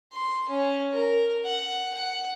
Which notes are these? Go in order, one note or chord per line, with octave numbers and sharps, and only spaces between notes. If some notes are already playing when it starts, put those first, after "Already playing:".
C6
C#4
A#4
F#5
F#5